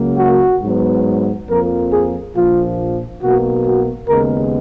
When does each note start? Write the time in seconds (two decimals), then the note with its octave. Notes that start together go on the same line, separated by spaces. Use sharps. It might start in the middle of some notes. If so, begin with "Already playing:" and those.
Already playing: C#2 C#3 F#3 A#3
0.18 F#4
0.61 G#2 F#3 B3
1.48 F2 F3 A#3 A#4
1.92 G#4
2.35 A#1 A#2 F3 F4
3.22 B1 B2 A#3 F#4
3.66 F#4
4.09 D#2 C#3 G#3 B3 A#4